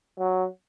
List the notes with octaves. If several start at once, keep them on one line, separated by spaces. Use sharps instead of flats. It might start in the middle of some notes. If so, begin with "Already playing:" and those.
F#3